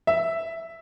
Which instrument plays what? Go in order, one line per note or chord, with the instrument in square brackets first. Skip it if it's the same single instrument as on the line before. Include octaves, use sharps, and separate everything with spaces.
[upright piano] E5